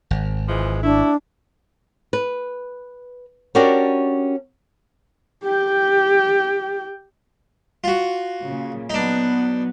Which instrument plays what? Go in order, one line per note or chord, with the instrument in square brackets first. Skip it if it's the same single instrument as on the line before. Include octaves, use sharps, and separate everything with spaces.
[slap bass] G#1
[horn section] E3 F3 G#3
[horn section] A3 E4 [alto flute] D4
[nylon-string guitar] B4
C#4 D4 F#4 G4 A#4 D5
[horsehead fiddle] G4 G5
[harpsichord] F4 F#4
[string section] A#2 C#3
[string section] F#3 B3 [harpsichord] D4 D#4